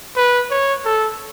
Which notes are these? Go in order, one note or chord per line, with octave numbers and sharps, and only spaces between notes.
B4
C#5
A4